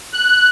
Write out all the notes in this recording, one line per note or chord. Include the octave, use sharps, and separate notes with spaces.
F#6